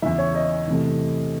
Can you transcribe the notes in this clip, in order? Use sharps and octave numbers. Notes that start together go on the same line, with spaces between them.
E2 C#3 E3 E5
C#5
D#5
E2 C3 E3 A3